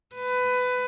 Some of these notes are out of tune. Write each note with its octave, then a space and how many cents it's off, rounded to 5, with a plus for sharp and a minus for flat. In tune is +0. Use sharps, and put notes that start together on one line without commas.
B4 +20